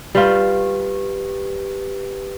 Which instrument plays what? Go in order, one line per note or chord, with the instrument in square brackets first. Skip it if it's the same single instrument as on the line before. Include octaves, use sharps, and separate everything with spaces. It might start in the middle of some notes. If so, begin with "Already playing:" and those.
[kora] G3 F4 [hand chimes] G4 B4